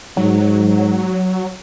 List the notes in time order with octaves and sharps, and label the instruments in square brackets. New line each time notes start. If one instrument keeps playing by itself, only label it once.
[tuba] G#2 [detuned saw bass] F#3